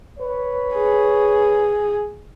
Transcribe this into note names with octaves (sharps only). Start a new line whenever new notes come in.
B4 C#5
G#4